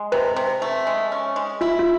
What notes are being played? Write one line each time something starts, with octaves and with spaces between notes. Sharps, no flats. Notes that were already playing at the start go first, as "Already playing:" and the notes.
Already playing: G#3
C3 B4
C3
A3
G#3
C#4
G#3
E4 F4
F4